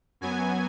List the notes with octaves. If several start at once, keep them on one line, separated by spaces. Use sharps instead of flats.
F#2 F#3 B3 G#5